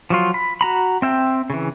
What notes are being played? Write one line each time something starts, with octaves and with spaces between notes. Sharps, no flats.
F3 F#3 F4
B5
F#4 A#5 B5
C4 E5 G5
C#3 E3